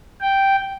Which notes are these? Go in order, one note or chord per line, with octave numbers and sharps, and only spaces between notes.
G5